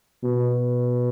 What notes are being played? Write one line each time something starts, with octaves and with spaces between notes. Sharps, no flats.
B2